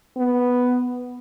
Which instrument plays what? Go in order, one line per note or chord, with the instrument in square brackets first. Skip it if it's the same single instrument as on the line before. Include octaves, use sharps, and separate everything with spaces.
[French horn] B3